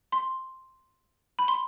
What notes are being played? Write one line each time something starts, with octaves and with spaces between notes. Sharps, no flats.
C6
B5
C6